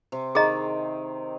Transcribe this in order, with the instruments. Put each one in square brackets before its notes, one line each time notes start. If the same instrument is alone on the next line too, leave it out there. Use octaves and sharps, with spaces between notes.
[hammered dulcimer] C3
[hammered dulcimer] D#3 [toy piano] G#4 D#5 A#5